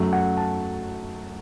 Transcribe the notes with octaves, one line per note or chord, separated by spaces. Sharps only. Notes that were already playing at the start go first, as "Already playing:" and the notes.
Already playing: F#2 F#3 A3
F#5
A5